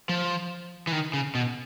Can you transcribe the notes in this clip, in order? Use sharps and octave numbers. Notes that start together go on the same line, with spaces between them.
F3
E3
D#3
C#3
B2